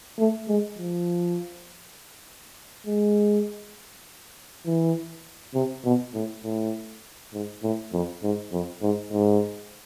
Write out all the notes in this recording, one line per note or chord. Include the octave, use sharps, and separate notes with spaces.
A3
G#3
F3
G#3
E3
C3
B2
A2
A2
G#2
A2
F2
G#2
F2
G#2
G#2